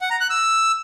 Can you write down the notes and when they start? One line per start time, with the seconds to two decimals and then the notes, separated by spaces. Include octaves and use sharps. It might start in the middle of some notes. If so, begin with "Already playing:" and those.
0.01 F#5
0.10 A#5
0.20 F#6
0.30 E6